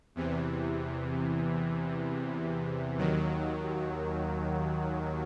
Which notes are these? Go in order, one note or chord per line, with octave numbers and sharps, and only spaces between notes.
E2 C3 E3
D#2 D#3 F#3